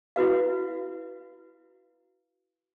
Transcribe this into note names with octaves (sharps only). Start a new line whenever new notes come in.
E4 F#4 B4 F5